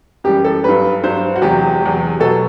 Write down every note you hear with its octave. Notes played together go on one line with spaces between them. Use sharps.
F#2 E3 G3 G4
A4
G2 F#3 B4
G2 F#3 C5
F#4
E2 C3 F#3 G4
E2 C3 F#3
B2 F#3 A4